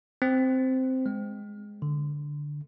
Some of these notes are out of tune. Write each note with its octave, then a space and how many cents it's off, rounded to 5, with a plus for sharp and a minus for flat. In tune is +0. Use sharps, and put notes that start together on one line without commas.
C4 -10
G#3 -5
D3 +0